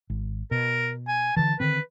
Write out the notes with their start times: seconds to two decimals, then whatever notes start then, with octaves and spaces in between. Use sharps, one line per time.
0.10 G#1
0.51 B2 A#4
1.08 G#5
1.37 D3 E3 A5
1.60 D3 D#3 C4 B4